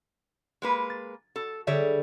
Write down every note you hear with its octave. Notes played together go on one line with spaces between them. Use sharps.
G#3 A#3 B4
A6
F#4 A4
D3 G3 G#4 C#5 E5 G5